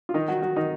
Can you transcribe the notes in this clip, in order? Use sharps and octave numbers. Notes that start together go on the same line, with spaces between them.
F4
D#3 D#4
F#3 F#4
F#3 F#4
D#3 D#4